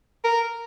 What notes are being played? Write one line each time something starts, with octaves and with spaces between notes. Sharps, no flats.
A#4